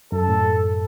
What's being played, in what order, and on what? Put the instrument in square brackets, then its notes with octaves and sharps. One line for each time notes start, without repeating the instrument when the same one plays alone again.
[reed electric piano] F#2 [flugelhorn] A4
[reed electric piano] A2